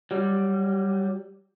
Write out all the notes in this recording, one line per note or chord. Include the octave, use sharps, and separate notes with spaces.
F#3 G3